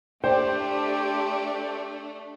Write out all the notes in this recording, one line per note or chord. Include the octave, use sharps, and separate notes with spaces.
A3 D4 G4 C5 D5 G5